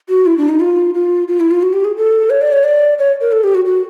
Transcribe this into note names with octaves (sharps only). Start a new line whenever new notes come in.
F#4
E4
D4
D#4
F4
F4
F4
E4
F4
F#4
G4
G#4
A4
C#5
D5
C#5
D5
C#5
A#4
A4
G4
F#4
F#4